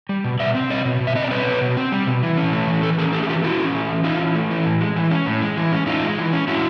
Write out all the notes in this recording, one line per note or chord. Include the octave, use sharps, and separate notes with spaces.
G3
B2
B2 D5 E5
C4
G3 C#5 D#5
B2
B2
E5
C4 D#5
D5
G3 B4 C#5
B2
B2
C4
G3
B2
E3
C#4
A3
E3
E3 A4 B4
C#4 G#4 A#4
A3 G4 A4
G#4
E3 F4 G4
E3 E4 F#4
C#4
A3
E3
E3 D#4 F4
C#4
A3
E3
A2
G#3
E3
C#4
A2
G#3
E3
C#4
A2 D#4 F4
G#3
E3
C#4
A2 E4 F#4